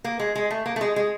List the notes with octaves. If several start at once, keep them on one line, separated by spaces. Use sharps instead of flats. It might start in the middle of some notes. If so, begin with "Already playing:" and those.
A#3
G#3
G#3
A3
A#3
A3
G#3
G#3